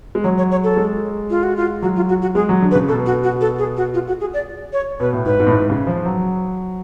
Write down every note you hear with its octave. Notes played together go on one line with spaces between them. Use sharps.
G#3
F#3 C#5
C#5
C#5
A4
G#3
F4
F#4
F4
F#3 F#4
F4
F#4
F#4
G#3 G#4
F#3
D3
B4
C#3
B2 A4
F#4
F#4
A4
G#4
F#4
F4
F#4
G#4
D5
C#5
B2 B4
A2
G#2 B4
G#2
A2
G#2
C#3
F3
F#3